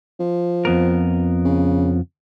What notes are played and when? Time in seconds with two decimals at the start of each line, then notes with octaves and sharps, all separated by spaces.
0.20 F3
0.65 F2 B3 A#4
1.45 C#3